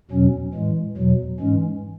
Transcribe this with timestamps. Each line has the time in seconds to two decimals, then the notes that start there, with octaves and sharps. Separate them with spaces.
0.11 E2 B2 F#3 C#4
0.53 A2 E3 G#3
0.97 E2 B2 F#3
1.39 G#2 E3 G#3 C#4